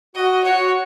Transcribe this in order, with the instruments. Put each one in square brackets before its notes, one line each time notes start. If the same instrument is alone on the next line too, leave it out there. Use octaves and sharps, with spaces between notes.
[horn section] F#4 [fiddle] D#5
[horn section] F#4 [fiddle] C#5